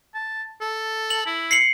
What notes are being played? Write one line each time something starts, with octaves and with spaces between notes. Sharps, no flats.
A5
A4
F#7
E4
C7 C#7 F#7